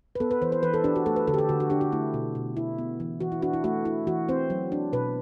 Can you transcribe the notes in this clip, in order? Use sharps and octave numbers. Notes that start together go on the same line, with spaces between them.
B4
B3 A4
B4
E3 C5
C5
E3 B4
A4
D4 G4
F#4
A3 A4
B4
D3 A4
G4
A4
D3 F#4
F#4
D4 G4
F#4
A3 E4
B2
B2
E4
B3
E3
E3 F#4
E4
D4 F#4
E4
A3 F#4
E4
E3 F#4
C4 C5
F#3
D4
B2 B4